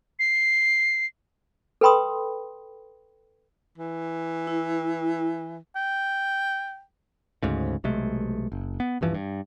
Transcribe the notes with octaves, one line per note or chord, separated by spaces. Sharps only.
C7
A4 B4 G5 B5 C6 D#6
E3
E4
G5
D2 G#2 C#3
B1 C3 G#3 A3
F#1
B3
D#1 G2 E3 F3
G2